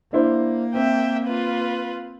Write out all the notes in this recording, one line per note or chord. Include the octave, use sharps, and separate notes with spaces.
A#3 D4 E4 C5
C4 E5 G5
F4 B4